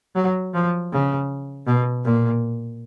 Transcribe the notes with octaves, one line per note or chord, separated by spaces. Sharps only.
F#3
F3
C#3
B2
A#2